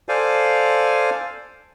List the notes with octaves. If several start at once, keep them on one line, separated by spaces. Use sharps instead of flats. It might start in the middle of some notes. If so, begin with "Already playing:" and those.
A4 C5 D5 F5 G#5